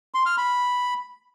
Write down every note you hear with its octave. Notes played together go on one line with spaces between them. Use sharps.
C6
F6
B5